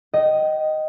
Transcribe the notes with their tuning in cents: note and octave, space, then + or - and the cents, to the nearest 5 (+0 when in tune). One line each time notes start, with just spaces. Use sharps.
D#5 +0 G5 -30